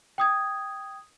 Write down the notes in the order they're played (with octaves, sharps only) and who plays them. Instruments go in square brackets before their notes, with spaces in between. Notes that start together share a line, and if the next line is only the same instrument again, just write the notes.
[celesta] G5 D#6 G#6